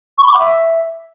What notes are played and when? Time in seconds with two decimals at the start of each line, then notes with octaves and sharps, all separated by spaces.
0.18 C#6
0.23 B5
0.28 D6
0.34 F#5
0.39 E5